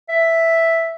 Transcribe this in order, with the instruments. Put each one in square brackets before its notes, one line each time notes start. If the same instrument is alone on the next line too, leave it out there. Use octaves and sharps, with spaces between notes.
[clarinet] E5